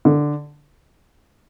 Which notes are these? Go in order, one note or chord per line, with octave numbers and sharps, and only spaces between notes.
D3